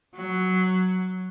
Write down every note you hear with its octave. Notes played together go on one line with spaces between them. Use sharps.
F#3